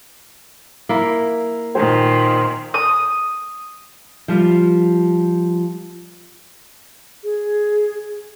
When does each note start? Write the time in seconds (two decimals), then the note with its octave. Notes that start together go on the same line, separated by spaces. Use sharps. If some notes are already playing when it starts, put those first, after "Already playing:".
0.89 A#3 E4
1.75 A#2 D#3 C5 G#5 C6
2.74 D#6
4.28 F3 G3 F4
7.24 G#4